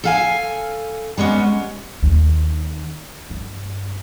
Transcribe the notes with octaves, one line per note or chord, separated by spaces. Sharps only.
A4 F5 G#5
G3 G#3 B3 C#4
D#2
G2